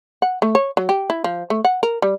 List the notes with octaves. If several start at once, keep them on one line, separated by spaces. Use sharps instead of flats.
F#5
A3
C#5
F#3
G4
E4
F3
A3
F#5
A#4
G3